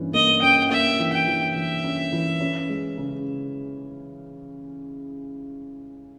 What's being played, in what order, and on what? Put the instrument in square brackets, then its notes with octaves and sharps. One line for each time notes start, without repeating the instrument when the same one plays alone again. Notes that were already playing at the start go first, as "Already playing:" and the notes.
Already playing: [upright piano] G2 E3 A#3 C#4
[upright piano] A#3 [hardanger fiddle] D#5
[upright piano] C#4 [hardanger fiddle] G5
[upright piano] A#3 [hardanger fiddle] E5
[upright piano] E3
[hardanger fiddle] G5
[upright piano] E3
[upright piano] E3 [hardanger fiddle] E5
[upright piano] C#4
E3
C#4
G#3
C#3